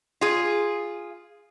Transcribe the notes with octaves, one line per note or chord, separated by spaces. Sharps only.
F4 G#4